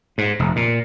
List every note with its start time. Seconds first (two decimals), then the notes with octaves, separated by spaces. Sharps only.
0.18 G#2
0.39 F1
0.56 A#2